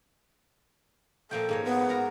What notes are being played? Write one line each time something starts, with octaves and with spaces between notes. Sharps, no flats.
A#2 F3 A4 G5
G#2 A#3 C#5
B3
F#4 A#4 A#5